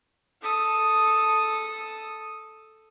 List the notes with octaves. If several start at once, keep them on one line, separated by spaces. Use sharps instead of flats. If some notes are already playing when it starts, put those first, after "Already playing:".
A4 D#6